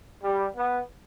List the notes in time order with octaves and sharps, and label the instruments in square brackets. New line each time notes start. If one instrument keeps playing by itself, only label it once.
[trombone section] G3
B3